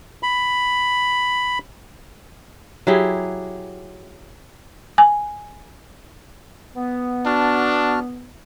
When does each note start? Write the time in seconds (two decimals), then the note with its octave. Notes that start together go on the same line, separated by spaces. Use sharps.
0.23 B5
2.87 F#3 E4 G4 G#4
4.98 G#5
6.75 B3
7.26 D4 F#4 A5 F6